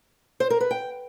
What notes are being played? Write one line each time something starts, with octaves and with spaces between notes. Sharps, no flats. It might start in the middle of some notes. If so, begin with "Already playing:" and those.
C5
A#4
B4
G5